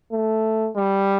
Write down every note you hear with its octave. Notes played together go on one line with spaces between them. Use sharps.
A3
G3